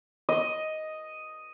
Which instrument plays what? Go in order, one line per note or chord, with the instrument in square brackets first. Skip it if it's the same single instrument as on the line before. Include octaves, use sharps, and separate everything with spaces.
[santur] D#5